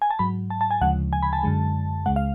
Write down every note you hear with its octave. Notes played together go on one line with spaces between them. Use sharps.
G#5
A5
G#2 F#3 B5
A5
A5
G#5
D2 C#3 F3 G#3 F#5
G#5
B5
A5
F#2 D3 G#3
C#2 C#3 G#3 F#5
F5